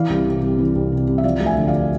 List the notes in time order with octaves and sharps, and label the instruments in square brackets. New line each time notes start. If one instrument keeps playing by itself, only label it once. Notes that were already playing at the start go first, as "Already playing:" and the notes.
Already playing: [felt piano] E3 D5 F5
C2
C3
C2
E3
C2
C3
C2
E5
F3 D5 F5
D2
E5 G#5
D3
D5 F5